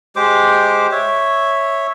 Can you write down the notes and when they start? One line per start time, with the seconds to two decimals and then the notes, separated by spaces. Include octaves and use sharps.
0.16 G#3 G4 C5 D6
0.91 C#5 E5